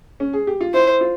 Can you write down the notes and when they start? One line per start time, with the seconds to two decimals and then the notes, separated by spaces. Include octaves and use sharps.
0.20 C#4
0.33 G#4
0.47 G4
0.61 F4
0.74 E4 C5
1.01 F4